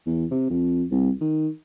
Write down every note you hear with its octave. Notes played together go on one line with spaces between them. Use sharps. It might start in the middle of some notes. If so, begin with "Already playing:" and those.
E2
C3
F2
C2
D#3